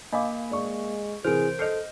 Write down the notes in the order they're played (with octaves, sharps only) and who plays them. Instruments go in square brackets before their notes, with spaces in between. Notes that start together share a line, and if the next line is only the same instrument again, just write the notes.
[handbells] A#3 [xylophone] D#5 F5 D6 [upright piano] G#5 B5
[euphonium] G#3 [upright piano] D5 C#6
[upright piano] C3 E3 [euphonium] G#4 [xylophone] A#4 F6 [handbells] C5 D7
[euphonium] A4 [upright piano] D#5 F6 G6 [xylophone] C7 C#7 F7